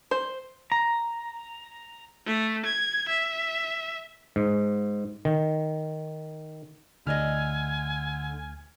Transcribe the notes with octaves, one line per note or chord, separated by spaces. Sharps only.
C5
A#5
A3
G#6
E5
G#2
D#3
D2 D3 E4 D5 D#5 G#5 F6